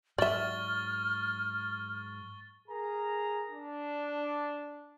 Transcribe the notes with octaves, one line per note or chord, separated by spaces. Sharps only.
G#2 F#3 D5 E5 C#6 F6 A6 G7
G#4 A#4 A#5
D4